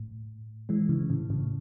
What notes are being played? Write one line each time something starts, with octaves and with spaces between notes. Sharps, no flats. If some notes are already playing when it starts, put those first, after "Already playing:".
Already playing: A2
E3 G#3
C#3 E3
A2 C#3
A2 C#3